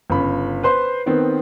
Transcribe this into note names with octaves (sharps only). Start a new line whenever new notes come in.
G1 C#3 B5
B4 C5 C6
D#3 B3 C4